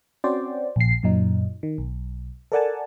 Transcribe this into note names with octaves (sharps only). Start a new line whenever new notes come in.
C4 C#4 F#4 C5 D5
A#1 C7
F#2 A#2 F#3 D#4
D#3
B1
A4 A#4 D5 F#5 G#5 A5